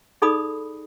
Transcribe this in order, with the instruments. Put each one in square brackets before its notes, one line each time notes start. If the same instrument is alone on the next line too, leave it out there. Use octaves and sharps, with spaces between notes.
[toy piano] D#4 G#4 A4 D5 B5 D#6